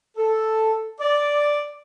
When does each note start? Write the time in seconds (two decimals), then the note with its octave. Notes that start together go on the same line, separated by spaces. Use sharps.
0.17 A4
1.00 D5